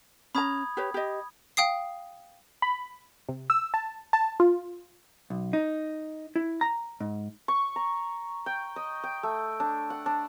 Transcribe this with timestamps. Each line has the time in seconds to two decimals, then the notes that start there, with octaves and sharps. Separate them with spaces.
0.35 C#4 A#5 B5 D#6 G#6
0.77 G4 B4 C#5
0.94 G4 D#5
1.57 F5 G5 D#6 C7
2.62 B5
3.29 C3
3.50 E6
3.74 A5
4.13 A5
4.40 F4
5.30 B1
5.53 D#4
6.36 E4
6.61 A#5
7.00 G#2
7.48 C#6
7.76 A#5
8.46 G5
8.76 D#5
9.03 G5
9.23 A3
9.60 D4
9.90 F#5
10.06 D4